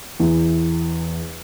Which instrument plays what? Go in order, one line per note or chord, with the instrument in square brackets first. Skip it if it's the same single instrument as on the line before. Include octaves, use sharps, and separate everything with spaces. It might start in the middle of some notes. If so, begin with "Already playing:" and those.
[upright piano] E2